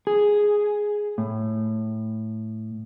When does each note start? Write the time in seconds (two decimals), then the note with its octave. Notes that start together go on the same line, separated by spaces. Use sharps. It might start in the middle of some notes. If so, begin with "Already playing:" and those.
0.07 G#4
1.18 A2